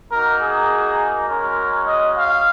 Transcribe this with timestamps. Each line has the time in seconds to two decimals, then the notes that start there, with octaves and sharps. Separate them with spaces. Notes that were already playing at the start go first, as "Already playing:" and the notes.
0.11 A#3 D#4 F#4 A#4
0.41 G#4
1.28 G#3 C#4 F#4 A#4
1.87 D#5
2.16 F5